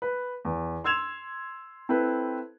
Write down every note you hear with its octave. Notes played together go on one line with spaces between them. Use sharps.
B4
E2
C6 E6 G#6 E7 F7
C4 E4 A4 B4